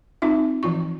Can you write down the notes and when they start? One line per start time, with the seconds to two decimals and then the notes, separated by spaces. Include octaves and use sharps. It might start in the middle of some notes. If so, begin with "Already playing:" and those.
0.22 C4 D#4 F4 E5
0.63 E3 F3 F4 C#6